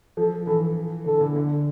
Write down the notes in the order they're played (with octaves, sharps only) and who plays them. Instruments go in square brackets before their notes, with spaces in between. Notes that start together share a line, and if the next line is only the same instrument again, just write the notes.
[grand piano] F3 [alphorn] A4
[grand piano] E3 [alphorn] A4
[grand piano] D3 [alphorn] A4
[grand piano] D3
D3